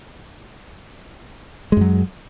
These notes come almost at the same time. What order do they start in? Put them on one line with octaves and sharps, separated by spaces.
G#3 F#2 F#3